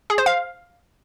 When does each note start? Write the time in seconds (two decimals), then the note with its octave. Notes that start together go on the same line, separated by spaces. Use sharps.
0.10 G#4
0.18 C5
0.26 F5